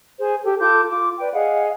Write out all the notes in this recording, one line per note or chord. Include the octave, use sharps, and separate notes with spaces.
G#4 C5
G4 A4
F4 A4 D6 G6
F4 D6
B4 D5 G5
G#4 D#5 F5 F#5